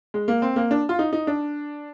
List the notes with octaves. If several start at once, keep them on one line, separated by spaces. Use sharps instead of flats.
G#3
A#3
C4
A#3
D4
F4
D#4
D#4
D4